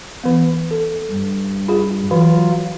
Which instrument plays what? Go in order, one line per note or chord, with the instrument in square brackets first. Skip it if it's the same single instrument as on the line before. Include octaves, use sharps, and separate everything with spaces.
[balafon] E3 B3
A4
[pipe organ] G2
[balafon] F4 G#4
[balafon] E3 [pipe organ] F#3 F4